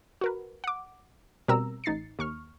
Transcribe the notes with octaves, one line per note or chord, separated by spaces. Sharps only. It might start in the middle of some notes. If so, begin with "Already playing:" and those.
F#4 A#4 B4
F#5 D6
B2 G3 C4 A#4 A#5 E6
A1 D#4 A6 C7 C#7
D#2 C#6 F6